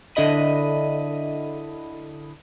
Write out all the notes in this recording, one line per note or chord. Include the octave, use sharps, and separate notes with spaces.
D3 D4 E4 D#5 B5 D#7